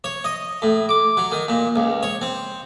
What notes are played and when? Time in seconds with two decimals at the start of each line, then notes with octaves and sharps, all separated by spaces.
0.04 C#5
0.24 D#5
0.62 A2
0.89 D6
1.17 F#3
1.32 D#3
1.48 A#2
1.76 C#2
2.03 C#5
2.22 C4